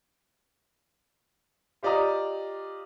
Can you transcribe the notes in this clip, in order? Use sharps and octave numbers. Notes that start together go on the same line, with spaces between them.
F4 G4 D5 D#5 A#5 D#6